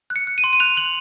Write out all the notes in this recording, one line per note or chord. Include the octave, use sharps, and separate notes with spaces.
F#6
C#7
F#6
D#7
C6
D#7
F#6 F7
F#6 F#7